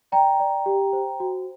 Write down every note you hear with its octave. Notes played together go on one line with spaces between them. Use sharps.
D5 G5 A#5
D5
G4
C5
F#4